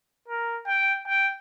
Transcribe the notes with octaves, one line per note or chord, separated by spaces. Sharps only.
A#4
G5
G5